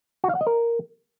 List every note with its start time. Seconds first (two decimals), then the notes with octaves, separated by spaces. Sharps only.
0.24 F#4
0.29 F5
0.35 F#5
0.41 D#5
0.47 A#4